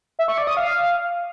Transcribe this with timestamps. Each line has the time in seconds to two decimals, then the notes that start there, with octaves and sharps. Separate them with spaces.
0.19 E5
0.28 C#6
0.38 D5
0.47 D#6
0.57 F5